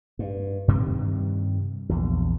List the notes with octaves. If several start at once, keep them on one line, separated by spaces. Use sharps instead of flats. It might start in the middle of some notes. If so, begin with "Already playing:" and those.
G2
G2 C3 D#3 G3
A#1 E2